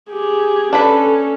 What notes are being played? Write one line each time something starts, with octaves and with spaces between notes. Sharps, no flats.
G4 G#4
C#4 D4 A4 B4 B5